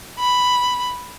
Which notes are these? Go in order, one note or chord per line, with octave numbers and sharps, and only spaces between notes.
B5